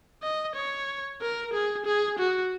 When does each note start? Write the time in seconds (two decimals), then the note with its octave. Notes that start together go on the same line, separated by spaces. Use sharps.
0.23 D#5
0.56 C#5
1.21 A#4
1.53 G#4
1.86 G#4
2.19 F#4